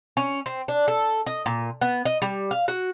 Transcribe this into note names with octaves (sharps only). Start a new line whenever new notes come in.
C#4
C4
D4
A4
D#5
A#2
B3
D#5
G3
F5
F#4